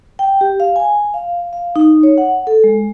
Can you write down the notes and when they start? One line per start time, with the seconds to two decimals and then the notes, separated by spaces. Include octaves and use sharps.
0.19 G5
0.41 G4
0.60 F5
0.76 G#5
1.14 F5
1.53 F5
1.76 D#4
2.03 C#5
2.18 F#5
2.47 A4
2.64 G#3